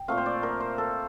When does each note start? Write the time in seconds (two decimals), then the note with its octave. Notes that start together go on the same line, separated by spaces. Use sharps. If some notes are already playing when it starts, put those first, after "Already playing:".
Already playing: G5
0.08 A#2 A3 C4 F5
0.18 C5
0.26 D5
0.43 A#4
0.60 C5
0.78 A4